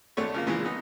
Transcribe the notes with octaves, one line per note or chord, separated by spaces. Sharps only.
G#1 A3 D4 C#5
C#3 F3 A#3
A#2 C#3 E3 F3 G#3
B3 D#4